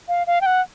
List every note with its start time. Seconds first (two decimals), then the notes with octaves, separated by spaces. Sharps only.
0.08 F5
0.27 F5
0.41 G5
0.46 F#5